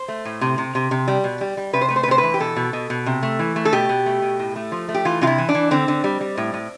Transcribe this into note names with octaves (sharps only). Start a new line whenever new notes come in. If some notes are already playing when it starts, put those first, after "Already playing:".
Already playing: C5
A3
A2
C3
C3
C3
C3
G3
B2
G3
G3
C3 B4
C5
A3 B4
C5
B4
C3 C5
B4
E3
G4
B2 A4
B2
B2
B2
C3
A3
E3
A3
A4
B2 G4
B2
A3
B2
A2
A3
F3
A3
G4
E3 F4
C3 F4
E4
E3
D4
E3
D3 C4
D3
G3
G3
A2
A2